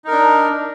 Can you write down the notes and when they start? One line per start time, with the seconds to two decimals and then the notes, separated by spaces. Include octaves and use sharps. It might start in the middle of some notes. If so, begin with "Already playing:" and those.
0.05 D#4
0.08 A#4
0.11 D4